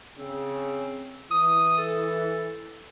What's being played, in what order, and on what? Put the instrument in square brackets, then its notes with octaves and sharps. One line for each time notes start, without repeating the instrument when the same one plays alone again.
[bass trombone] C#3 [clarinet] C4
[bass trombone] E3 [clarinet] D#6
[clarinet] A4